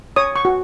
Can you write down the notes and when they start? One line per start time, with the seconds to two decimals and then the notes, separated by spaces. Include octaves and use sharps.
0.16 C#5 D#6
0.36 C#6
0.45 F#4